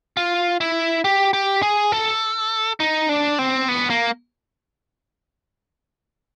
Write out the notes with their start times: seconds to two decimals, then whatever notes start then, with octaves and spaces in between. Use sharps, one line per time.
0.17 F4
0.61 E4
1.04 G4
1.33 G4
1.62 G#4
1.92 A4
2.80 D#4
3.09 D4
3.39 C4
3.68 B3
3.90 A#3